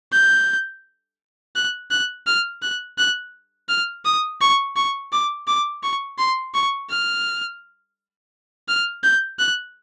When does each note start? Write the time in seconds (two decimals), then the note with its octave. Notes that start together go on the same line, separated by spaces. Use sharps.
0.12 G6
1.56 F#6
1.91 F#6
2.27 F6
2.62 F#6
2.98 F#6
3.69 F6
4.05 D#6
4.41 C#6
4.76 C#6
5.12 D6
5.47 D6
5.83 C#6
6.18 C6
6.54 C#6
6.90 F6
8.68 F6
9.04 G6
9.39 F#6